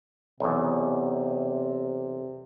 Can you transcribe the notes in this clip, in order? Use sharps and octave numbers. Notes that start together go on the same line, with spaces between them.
B1 E2 C3